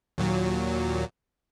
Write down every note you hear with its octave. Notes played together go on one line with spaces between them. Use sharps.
D#2 A#2 F#3